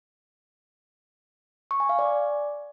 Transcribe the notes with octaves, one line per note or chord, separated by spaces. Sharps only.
C#6
G#5
F5
D5